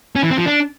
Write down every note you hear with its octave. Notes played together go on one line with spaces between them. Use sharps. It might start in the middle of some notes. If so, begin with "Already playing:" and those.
C#4
E3
C4
F3
D4